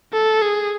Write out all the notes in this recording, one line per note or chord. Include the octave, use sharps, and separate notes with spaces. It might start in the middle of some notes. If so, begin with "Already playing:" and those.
A4
G#4